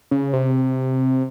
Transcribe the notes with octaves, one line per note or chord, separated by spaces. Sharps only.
C#3
C3